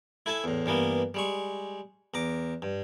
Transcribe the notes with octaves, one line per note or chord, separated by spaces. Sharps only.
E4 A4 G#5 A5
E2 A2
G2 E3 A#3 B3
G3 G#3 C#6
E2 A#5 D6
G2